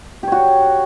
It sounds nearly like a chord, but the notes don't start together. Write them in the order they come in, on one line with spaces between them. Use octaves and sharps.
G4 C#5 F#4